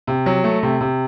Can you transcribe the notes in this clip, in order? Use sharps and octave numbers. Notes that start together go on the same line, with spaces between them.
C3
F#3
A3
C3
C3